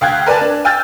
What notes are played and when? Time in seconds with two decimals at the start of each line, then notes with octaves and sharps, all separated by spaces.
0.01 D2 F5 G5 F#6 G#6
0.26 A#4 B4 D5 G#5 A5
0.41 D4
0.65 G5 G#5 E6 F6 G6 A6